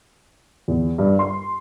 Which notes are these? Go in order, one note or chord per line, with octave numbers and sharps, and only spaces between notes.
E2
G2
C6